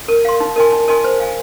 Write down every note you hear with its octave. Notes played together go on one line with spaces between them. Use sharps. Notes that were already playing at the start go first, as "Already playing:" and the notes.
A#4
F5 C6
D#4
A#4 D#5 G#5 C6
D#4
A#4 D#5 G#5 C6
C5
F5 G#5